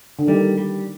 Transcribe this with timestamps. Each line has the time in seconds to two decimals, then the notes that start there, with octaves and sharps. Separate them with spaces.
0.19 D3
0.27 D#3 G3
0.58 G3